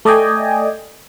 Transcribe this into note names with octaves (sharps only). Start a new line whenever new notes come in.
A3 D5 D#5 G5 G#5